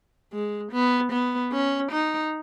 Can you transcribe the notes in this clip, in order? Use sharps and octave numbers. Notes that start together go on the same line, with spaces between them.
G#3
B3
B3
C#4
D#4